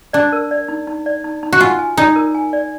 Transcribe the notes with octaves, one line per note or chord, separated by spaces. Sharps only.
D4 D5
A#4
D5
D#4
D#4
D5
D#4
D#4
F#4
F4 G#5
G#5
D#4 D5
A#4
G#5
D5